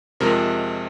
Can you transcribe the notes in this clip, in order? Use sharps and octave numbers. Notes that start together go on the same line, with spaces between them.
F2 C3 F3 G#3 A#4